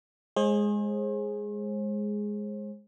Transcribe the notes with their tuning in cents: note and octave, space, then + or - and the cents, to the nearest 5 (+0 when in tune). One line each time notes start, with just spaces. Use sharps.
G#3 +0 G#4 +0 C5 +40